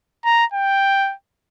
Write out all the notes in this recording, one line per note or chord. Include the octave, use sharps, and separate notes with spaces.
A#5
G5